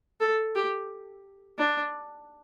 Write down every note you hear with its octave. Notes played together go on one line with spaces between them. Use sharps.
A4
G4
D4